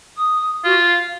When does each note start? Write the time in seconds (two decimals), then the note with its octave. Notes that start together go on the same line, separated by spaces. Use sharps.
0.16 D#6
0.65 F4 F#4
0.79 F5